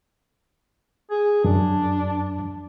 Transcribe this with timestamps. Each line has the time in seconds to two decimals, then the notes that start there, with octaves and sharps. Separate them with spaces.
1.11 G#4
1.44 F#2 D4